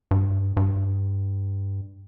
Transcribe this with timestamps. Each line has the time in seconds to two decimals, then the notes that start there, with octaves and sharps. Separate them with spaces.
0.11 G2
0.57 G2